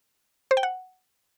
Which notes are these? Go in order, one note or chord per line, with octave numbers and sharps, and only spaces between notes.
C5
G5
F#5